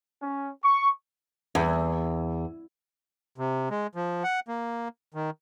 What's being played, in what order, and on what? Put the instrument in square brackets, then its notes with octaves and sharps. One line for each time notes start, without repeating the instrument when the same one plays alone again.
[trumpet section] C#4
C#6
[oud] E2
[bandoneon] C3
G#3
F3
F#5
A#3
D#3